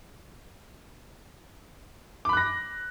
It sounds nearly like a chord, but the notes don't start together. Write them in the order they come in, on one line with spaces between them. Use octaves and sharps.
D6 B5 F#6 A#6